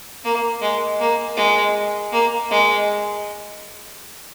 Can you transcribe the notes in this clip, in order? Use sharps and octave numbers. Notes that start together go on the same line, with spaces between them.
A#3
G#3
A#3
G#3
A#3
G#3